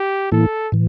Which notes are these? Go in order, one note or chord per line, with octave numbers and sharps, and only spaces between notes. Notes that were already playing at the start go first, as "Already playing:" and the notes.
Already playing: G4
A2 E3 A#3 E4 A4
A2 E3